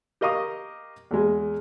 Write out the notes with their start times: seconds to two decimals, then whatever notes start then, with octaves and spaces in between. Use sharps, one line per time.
0.21 G4 A#4 D#5 F5 C#6 D#6
1.11 E2 G#3